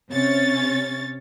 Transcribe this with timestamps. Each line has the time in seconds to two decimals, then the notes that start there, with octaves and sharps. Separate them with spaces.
0.11 C3 C#4 C#5 A6